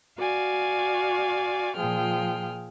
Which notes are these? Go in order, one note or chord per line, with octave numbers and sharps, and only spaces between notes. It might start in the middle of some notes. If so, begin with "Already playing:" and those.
F#4 D5 F5 G#5
A#2 F3 G#4 G5 F6